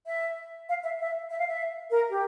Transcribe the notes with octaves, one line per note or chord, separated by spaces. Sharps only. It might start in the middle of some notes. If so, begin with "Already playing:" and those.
E5
F5
E5
E5
E5
F5
E5
A#4
G4